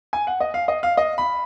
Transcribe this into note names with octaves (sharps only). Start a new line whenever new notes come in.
G#5
F#5
D#5
F5
D#5
F5
D#5
B5